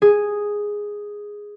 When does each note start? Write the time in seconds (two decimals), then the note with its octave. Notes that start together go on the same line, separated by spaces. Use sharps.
0.02 G#4